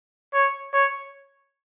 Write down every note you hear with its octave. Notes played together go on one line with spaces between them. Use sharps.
C#5
C#5